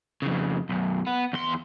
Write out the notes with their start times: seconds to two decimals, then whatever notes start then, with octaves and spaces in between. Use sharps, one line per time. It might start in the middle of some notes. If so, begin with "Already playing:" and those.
0.22 F2 C#3
0.69 B1 F#2
1.07 B3
1.33 E2 C6